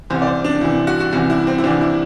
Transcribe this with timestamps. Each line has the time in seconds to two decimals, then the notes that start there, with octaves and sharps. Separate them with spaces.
0.10 C2 C3 E3 C5
0.22 D5
0.27 C5
0.44 D4
0.61 C2 C3 E3 E4
0.87 F#4
1.00 F#4
1.13 C2 C3 E3 F#4
1.30 E4
1.47 C4
1.58 E4
1.64 C2 C3 E3 D4
1.81 E4